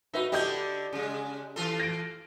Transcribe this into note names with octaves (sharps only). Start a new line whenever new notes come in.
D#4 F#4 B4 E5
D3 D4 E4 G4 D#5 G6
C#3 G#3
E3 F4 A4
A#6 D7